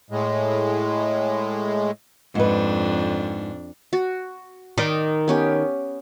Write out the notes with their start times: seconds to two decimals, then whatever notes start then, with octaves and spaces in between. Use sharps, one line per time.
0.10 A2 G#3
2.35 F2 G#2 D4 B4
3.93 F#4
4.78 D#3 D5 D#5
5.28 B3 C#4 G4